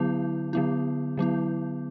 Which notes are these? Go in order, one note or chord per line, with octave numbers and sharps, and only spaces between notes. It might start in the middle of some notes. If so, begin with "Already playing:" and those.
Already playing: D3 F#3 B3 E4
D3 F#3 B3 E4
D3 F#3 B3 E4